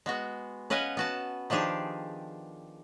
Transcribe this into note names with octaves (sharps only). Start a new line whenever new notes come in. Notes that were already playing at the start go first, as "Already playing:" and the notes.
G#3 B3 F#4
C#4 B4 D#5 F5 F#5 G#5
B3 F#4 A5
D#3 F3 D4 G4 G#4